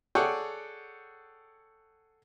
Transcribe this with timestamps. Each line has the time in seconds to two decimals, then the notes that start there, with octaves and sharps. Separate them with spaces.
0.15 G#4 A4 C#5 D5 F#5 G5